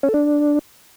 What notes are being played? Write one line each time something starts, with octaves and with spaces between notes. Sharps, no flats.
C#4
A4
D4